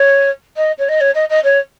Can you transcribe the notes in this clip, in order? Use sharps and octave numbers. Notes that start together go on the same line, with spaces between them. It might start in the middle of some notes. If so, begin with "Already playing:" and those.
Already playing: C#5
D#5
C#5
D#5
C#5
D#5
D#5
C#5